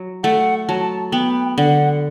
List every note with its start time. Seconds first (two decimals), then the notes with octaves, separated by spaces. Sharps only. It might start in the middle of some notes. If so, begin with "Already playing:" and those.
Already playing: F#3
0.23 A3 F#5
0.68 F#3 A5
1.12 B3 G5
1.57 D3 F#5